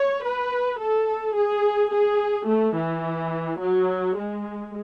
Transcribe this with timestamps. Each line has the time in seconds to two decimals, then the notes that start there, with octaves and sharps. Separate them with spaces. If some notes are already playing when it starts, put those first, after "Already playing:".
Already playing: C#5
0.25 B4
0.80 A4
1.36 G#4
1.92 G#4
2.48 A3
2.76 E3
3.60 F#3
4.17 G#3